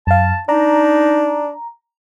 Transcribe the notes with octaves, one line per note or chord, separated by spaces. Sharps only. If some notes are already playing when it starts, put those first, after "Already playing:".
F#2 F5 A5
D4 D#4 A#5